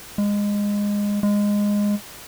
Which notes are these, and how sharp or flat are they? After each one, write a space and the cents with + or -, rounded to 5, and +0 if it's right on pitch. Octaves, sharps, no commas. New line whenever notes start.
G#3 -20
G#3 -15